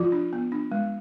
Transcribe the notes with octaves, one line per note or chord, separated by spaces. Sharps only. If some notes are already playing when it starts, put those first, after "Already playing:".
Already playing: F3 F4
D4
B3
D4
G#3